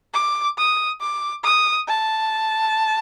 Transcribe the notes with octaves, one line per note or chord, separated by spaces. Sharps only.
D6
D#6
D6
D#6
A5